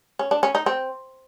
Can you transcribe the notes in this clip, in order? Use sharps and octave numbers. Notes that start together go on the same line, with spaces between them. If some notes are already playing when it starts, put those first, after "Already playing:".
C#4
D4
C#4
D#4
C4